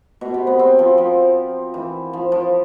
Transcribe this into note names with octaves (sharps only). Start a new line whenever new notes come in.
B2
C3
B3
C4
F3
F3
E3
F3
F3